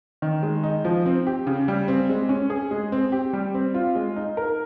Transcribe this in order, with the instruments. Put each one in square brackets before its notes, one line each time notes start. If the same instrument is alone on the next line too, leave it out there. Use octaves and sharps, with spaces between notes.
[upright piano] D#3
G#3
D#4
F3
C4
G4
C#3
G3
C4
G#3
C#4
G#4
G#3
C4
G4
G3
C4
F4
G#3
D#4
A#4